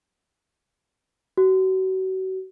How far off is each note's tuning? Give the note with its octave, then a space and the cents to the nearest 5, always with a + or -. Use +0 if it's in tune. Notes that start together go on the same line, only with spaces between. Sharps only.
F#4 +35